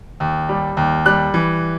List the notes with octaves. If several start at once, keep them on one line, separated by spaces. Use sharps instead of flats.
D#2
G3
D#2
G3 F#6
E3